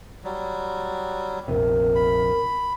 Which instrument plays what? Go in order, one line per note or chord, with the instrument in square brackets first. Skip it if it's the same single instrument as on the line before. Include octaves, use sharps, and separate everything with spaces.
[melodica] F#3 G3
[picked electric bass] A#1 F2 C3 [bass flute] A#4
[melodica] B5